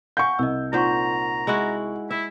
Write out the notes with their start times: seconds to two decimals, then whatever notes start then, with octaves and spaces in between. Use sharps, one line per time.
0.17 F5 F#5 G#5 C#6 G6
0.39 C2 D#5 E6
0.73 A#2 D#4 C5 F#5 A#5 C#6
1.47 G#3 E4 F#4
2.11 E4 E5